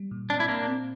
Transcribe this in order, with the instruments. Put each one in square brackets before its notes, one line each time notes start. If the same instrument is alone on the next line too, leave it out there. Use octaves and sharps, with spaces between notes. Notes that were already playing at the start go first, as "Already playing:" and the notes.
Already playing: [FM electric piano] G3
A#2
[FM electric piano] C4 [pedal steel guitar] D4
[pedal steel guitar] E4
[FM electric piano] A#2 [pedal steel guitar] A#3 D4
[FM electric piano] C4